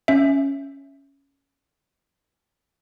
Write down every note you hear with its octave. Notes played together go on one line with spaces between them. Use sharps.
C#4 E5